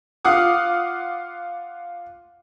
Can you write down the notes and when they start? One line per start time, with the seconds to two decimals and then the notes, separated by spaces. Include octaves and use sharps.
0.25 F4 F5 F#5 D6 D#6